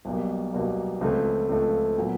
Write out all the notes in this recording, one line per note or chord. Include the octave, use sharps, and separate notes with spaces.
B1 B2 G3 A#3
B1 B2 G3 A#3
C#2 C#3 F3 A3 C4
C#2 C#3 F3 A3 C4
A#2 F#3 B3